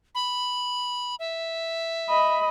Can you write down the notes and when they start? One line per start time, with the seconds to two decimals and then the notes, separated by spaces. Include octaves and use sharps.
0.15 B5
1.19 E5
2.10 D#5 B5